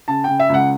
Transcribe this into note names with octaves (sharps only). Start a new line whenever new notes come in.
C#3 A5
C#3 G5
E5
C#2 F#5